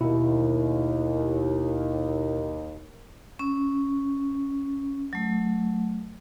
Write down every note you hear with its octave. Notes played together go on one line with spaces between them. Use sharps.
D#2 B2 E4
C#4
F#3 A3